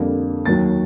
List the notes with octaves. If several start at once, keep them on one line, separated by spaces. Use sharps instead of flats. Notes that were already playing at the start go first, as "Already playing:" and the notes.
Already playing: F2 D3 G3 A#3
D#2 D#3 F#3 A6